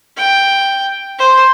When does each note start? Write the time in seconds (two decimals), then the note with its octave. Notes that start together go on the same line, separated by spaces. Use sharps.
0.18 G5
1.19 C5